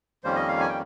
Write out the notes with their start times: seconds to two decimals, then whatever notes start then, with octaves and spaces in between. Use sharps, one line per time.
0.24 F2 D#3 G3 A#3 C#4 C5
0.36 D#5
0.48 F5
0.60 G#5
0.69 G5